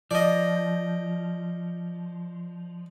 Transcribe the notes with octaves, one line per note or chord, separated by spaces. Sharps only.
F3 D5 D#5